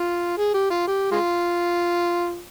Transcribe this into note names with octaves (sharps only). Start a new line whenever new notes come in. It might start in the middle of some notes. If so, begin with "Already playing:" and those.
Already playing: F4
G#4
G4
F4
G4
G#3 F4